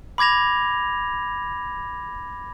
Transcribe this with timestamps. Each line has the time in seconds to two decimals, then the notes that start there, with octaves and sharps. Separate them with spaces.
0.18 B5 D6 G#6 A#6 F7